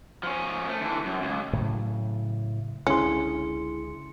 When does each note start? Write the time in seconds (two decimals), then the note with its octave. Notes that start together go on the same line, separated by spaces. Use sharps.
0.23 F3 C#4
0.69 A3
0.81 D3 E3
1.05 F#2
1.22 C#2
1.53 A2 C#3 F#3
2.87 C#2 D3 C#4 D4 E4 G#4 C6 C#7